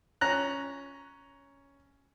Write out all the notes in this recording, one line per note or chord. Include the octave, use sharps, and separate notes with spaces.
C#4 A#5 F#6